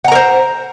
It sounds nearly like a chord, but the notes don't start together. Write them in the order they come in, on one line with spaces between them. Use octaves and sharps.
F#5 A#5 A#4 C5